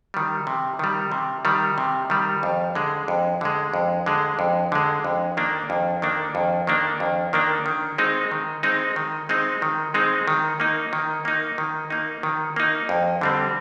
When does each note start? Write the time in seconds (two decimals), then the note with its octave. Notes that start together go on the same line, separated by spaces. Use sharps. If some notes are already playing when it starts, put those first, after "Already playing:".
0.14 D#3 G3
0.47 C3
0.79 D#3 G3
1.12 C3
1.45 D#3 G3
1.78 C3
2.10 D#3 G3
2.43 F2
2.75 D3 G#3
3.08 F2
3.41 D3 G#3
3.74 F2
4.06 D3 G#3
4.39 F2
4.72 D3 G#3
5.05 F2
5.37 D#3 A#3 D4
5.70 F2
6.02 D#3 A#3 D4
6.35 F2
6.67 D#3 A#3 D4
7.00 F2
7.33 D#3 A#3 D4
7.66 D#3
7.98 G#3 C4 D#4
8.31 D#3
8.63 G#3 C4 D#4
8.96 D#3
9.29 G#3 C4 D#4
9.62 D#3
9.94 G#3 C4 D#4
10.28 D#3
10.60 A#3 D#4
10.93 D#3
11.25 A#3 D#4
11.58 D#3
11.90 A#3 D#4
12.23 D#3
12.56 A#3 D#4
12.89 F2
13.21 D3 G3 C4